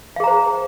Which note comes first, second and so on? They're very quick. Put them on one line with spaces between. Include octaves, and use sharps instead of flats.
F5 G#4 A#5 C5